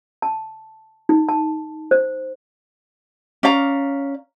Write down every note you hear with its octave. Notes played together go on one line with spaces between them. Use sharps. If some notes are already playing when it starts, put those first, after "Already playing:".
A5
D#4
A5
C5
C#4 D5 F5 A#5